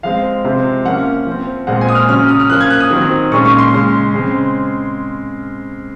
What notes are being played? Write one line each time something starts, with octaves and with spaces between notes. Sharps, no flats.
F3 G#3 C4 F5
C3 F3 G#3 C4
F3 A#3 C#4 F#5
F3
C4
A#2 G#3 C4 F#5
G#5
D#6
F6
C#3 F#3 C#4 F6
D#6
F6
F3 A#3 C#4 F#6
G#6
F#6
D#6
D#3 F#3 C4
A#2 G#3 C#4 C#6
C#6
C6
C#3 G#3 C#4
C#3 G#3 C4